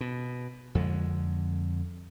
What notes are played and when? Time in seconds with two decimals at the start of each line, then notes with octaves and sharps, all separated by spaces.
0.01 B2
0.75 F2 D3 G#3